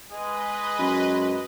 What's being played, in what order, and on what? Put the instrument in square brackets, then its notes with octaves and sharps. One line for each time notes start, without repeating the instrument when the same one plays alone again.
[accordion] G#3 [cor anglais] G#4 [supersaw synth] B4 D#5
[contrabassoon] F#2